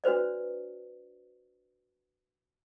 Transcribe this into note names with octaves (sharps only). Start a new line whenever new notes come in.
D4 F#4 B4 C5 D5